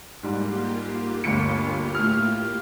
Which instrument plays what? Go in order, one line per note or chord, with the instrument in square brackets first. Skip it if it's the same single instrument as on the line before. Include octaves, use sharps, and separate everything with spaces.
[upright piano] G#2 G3 [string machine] A#3 F4 G4
[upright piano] G1 D2 C#7
A2 F6